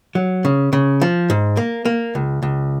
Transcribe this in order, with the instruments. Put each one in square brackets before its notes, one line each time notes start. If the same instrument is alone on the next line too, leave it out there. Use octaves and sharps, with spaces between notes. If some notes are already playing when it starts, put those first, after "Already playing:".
[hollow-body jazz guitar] F#3
C#3
C#3
F3
G#2
A#3
A#3
C#2
C#2